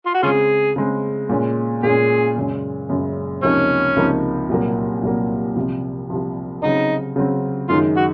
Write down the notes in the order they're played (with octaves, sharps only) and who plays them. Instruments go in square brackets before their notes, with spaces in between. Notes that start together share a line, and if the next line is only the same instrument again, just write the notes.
[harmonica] F4
F#4
[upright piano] C#3 G#3 C4 [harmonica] C#4 F4 G#4
[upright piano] C#3 G#3 C4
A#2 G#3 C#4
[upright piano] A#2 G#3 C#4 [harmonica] G#4
[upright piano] F#2 C#3 G#3 C#4
F#2 C#3 G#3 C#4
[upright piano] C#2 C3 F3 A#3 D#4 [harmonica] C#4
[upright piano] C#2 C3 F3 A#3 D#4
C2 A#2 F#3 A#3
C2 A#2 F#3 A#3
C2 C3 F3
C2 C3 F3
[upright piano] C#3 F#3 C4 [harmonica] D#4
[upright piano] C#3 F#3 C4
[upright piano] F#2 D#3 G#3 D#4 [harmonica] F4
[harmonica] F#4